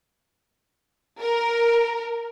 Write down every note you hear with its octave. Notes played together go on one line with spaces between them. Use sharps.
A#4